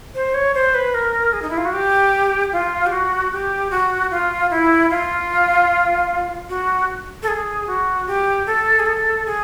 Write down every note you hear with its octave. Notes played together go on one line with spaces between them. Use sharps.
C5
C#5
C5
B4
A#4
G#4
D#4
E4
F4
F#4
G4
F4
G4
F#4
G4
F#4
F4
E4
F4
F#4
A4
G#4
F#4
G4
A4
G#4
A4
G#4